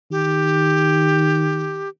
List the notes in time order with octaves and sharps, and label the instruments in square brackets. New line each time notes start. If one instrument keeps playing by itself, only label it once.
[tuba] D#3 [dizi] G4